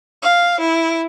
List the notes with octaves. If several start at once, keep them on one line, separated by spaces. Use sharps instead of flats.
F5
E4